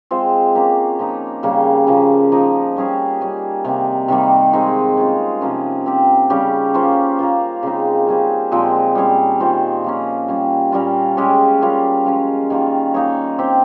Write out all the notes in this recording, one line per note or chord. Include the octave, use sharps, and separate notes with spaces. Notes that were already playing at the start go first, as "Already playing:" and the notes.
G#3 C4 F4 C5
A#3 C#4 G4 A#4
F3 A#3 D#4
C#3 G3 A#3
C#3 F3 A#3
F3 A#3 D#4
G3 C#4 G#4 C#5
G3 C#4 G#4
C3 D#3 A#3
C3 D#3 G3 A#3
G#3 C4 D#4 G#4
G#3 C#4 F4
C3 F3 A#3 C#4
C4 G4 A#4
C#3 G3 C#4 G4
A#3 C#4 F4 C5
A#3 F4 C5
C#3 G#3 C4 D#4
G3 C#4 G#4 C5
A#2 F3 G#3 C4
G3 C#4 G#4 C#5
D#3 A#3 F4 C5
F3 A#3 C#4
G3 C#4 F4
A#2 G3 C#4 F4
G#3 C#4 G4 C#5
G3 C#4 F4 A#4
F3 G#3 C#4
D#3 G3 A#3 F4
A#3 D#4 G#4 C#5
C4 G4 C5